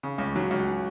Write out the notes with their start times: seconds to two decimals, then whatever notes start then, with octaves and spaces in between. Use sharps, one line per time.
0.03 C#3
0.18 C#2
0.36 F#3
0.51 C#2